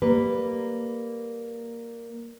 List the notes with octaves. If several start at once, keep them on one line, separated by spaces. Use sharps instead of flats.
G3 A#3 B4